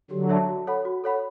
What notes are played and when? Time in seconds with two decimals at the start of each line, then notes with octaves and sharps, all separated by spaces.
0.11 D3 F#3 G4
0.29 C#5 E5 A5
0.49 F#4
0.67 A4 C#5 F#5 B5
0.85 F#4
1.04 A4 C#5 F#5 B5